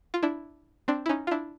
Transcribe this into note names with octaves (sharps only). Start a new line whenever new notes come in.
F4
D4 E4
C4 D4
E4
C#4 D#4
F4
D4 E4